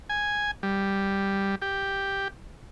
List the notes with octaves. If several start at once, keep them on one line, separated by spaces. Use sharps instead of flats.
G#5
G3
G4